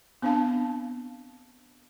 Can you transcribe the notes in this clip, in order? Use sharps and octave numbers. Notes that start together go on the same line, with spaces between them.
B3 C4 D4 F5 A5